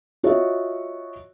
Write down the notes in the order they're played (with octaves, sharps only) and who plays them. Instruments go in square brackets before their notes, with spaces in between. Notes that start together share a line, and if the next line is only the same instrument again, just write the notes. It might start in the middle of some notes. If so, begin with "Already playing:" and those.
[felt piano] F4 F#4 C#5 D#5 E5